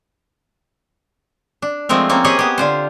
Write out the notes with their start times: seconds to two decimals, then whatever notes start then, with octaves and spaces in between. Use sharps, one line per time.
1.62 D4
1.89 F3 G#3 A3 C4 A#4
2.10 A#3 C4 C#4
2.24 G4 G#4 C#5 D#5
2.39 B3 G4
2.58 D3 F4 C5